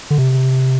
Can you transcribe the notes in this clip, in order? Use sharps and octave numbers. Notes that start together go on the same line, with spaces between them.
D3
C3